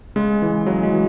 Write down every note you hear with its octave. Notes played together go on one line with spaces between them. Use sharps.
C#3 G#3
E3
C#3 F#3
G#3
E3